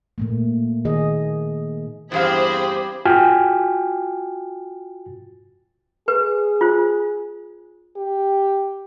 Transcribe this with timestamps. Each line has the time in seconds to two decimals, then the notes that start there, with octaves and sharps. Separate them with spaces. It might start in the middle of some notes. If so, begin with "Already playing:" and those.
0.18 A#2 A3 A#3
0.85 D#3 G#4 D#5
2.12 E2 G2 C4 G4 G#4 C5 F5 B5
3.05 F4 F#4 G5 G#5 F6
6.08 G#4 B4
6.61 F4 C5
7.96 G4